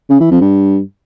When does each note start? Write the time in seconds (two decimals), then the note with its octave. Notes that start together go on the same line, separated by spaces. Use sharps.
0.10 C#3
0.20 E3
0.31 F2
0.41 G2